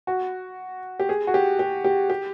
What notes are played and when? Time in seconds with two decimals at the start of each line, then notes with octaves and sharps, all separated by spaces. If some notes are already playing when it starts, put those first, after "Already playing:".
0.07 F#4
1.00 G4
1.09 G#4
1.27 F#4
1.34 G4
1.59 G4
1.84 G4
2.10 G4